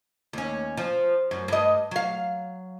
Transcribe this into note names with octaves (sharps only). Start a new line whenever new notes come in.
D#2 C#4
F3
F#2
G2 D#5
F#3 F5